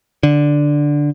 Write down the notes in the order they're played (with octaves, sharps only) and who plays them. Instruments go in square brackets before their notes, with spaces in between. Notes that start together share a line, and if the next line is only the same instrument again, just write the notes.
[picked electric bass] D3